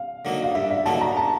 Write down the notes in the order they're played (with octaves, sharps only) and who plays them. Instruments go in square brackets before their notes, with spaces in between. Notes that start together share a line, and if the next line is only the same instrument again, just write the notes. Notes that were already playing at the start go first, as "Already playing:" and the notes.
Already playing: [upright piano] F5
[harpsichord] D3 F#3 A#3 D#4
[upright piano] F5
[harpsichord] G2 [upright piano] E5
[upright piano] E5
[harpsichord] D3 F#3 A#3 D#4 [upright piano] A5
[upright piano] A#5
A5